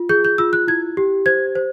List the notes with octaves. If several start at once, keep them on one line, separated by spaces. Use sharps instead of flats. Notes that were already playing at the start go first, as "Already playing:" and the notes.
Already playing: F4
G#4 G6
G6
F4 E6
F#6
E4 G#6
G4
C5 G#6
C5